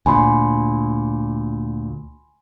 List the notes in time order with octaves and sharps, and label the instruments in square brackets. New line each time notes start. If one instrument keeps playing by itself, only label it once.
[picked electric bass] D2 A#2 [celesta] G#5 B5 C6